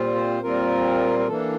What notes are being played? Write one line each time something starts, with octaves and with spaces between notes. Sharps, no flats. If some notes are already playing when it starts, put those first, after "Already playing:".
Already playing: A#2 G3 C4 F4
C5
A#2 G3 C4 F4 A#4
A#4
E3 A#3 D4 A4